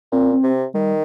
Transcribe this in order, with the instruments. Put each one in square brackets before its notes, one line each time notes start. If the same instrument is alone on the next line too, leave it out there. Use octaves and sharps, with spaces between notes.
[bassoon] A#2 [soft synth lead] C4
[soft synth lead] C4
[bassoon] C3
[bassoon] D#3 [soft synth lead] G3